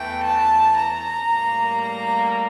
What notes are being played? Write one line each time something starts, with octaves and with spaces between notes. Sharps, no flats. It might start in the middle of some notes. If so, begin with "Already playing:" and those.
Already playing: E2 E3 A3 G5
A5
A#5
A2 G3 A#3
A#5